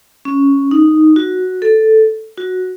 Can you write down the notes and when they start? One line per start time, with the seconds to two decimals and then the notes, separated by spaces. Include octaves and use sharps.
0.25 C#4
0.71 D#4
1.16 F#4
1.62 A4
2.37 F#4